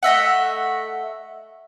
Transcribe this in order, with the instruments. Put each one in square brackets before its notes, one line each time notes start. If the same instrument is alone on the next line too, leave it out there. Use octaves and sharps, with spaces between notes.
[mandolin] A3 D#5 E5 F#5